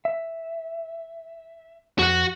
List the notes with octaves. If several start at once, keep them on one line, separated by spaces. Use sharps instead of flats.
E5
F2 F#4 F#5